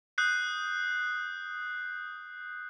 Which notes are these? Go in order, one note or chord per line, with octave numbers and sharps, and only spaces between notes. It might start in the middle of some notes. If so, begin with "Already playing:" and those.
D#6 F#6 G6 C7